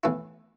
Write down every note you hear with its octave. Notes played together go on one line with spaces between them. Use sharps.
A2 E3 B3 E4